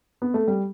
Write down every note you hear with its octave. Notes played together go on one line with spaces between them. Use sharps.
B3
A3
G3